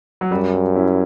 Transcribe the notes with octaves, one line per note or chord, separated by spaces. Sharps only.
F#3
F#2 G3
G3
C#4 E4